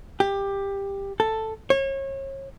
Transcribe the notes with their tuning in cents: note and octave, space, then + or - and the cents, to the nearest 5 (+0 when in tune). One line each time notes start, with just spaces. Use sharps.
G4 +15
A4 +5
C#5 -35